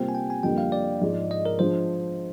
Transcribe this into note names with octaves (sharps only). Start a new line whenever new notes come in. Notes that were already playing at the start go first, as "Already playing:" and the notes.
Already playing: C3 G3 A#3 F4 C5 G5
G#5
G5
G#5
F2 D3 G3 A#3 G5
F5
D5
G#2 F3 G#3
D#5
A#4
F3 G#3 D4 C5